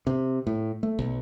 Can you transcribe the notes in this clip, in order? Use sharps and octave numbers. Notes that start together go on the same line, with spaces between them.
C3
A2
A3
B1